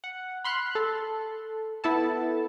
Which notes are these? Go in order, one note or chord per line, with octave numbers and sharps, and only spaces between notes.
F#5
B5 C6 F6 F#6
A4
B3 E4 A4 A5